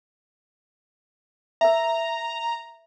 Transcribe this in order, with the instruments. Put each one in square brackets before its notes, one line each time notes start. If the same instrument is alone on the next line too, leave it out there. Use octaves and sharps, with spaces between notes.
[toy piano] A#4 E5 [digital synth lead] A#5